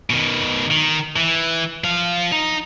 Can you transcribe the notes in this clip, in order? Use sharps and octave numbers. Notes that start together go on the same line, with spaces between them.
B2 D#3
D#3
E3
F3 F5
D#4